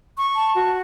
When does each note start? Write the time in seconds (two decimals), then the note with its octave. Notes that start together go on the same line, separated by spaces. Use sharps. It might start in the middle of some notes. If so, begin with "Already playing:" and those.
0.17 C#6
0.35 A5
0.54 F#4